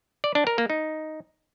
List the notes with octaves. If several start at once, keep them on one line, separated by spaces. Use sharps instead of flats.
D5
D4
A#4
A#3
D#4